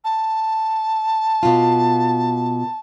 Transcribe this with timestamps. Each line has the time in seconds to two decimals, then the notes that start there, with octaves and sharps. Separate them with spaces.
0.04 A5
1.43 B2 A#3 F4